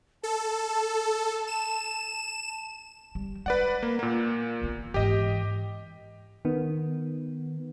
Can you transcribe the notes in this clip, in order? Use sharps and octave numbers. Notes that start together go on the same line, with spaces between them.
A4 A5
E7
G3
G#3 B4 D5 F#5
A#3
A#2 A#3
D#2 B3
G#2 E3 G4 D#5
D#3 B3